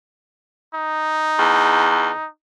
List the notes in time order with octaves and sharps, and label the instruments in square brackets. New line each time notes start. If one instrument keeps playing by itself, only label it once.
[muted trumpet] D#4
[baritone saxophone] E2